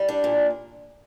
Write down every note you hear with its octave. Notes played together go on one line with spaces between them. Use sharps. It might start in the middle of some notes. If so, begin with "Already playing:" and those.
Already playing: G3
D4
A#2